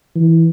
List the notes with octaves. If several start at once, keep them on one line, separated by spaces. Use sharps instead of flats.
E3